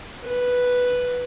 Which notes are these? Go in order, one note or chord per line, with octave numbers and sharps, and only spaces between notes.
B4